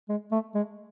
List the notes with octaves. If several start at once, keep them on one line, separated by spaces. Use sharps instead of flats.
G#3
A3
G#3